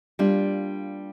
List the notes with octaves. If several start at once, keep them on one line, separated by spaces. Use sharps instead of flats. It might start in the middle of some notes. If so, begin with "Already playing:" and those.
G3 A#3 D4 F4